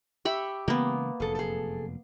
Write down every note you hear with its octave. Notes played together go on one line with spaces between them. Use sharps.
G4 E5 B5 C#6
C#3 E3 G#3 A#3 B3
F1 F#2 A#2 G#4 A4
G#4 A4